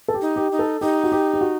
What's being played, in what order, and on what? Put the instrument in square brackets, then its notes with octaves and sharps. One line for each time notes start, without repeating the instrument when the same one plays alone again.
[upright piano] A4
G4
[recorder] D#4
[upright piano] G4
[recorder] D#4
[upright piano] A4
[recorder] D#4 [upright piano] G4
[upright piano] F#4
G4
G4
F#4